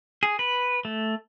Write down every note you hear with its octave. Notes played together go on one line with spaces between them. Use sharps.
G#4
B4
A3